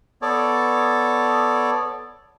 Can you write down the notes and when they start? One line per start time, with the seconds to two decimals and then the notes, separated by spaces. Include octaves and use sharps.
0.22 B3 A4 C#5 D5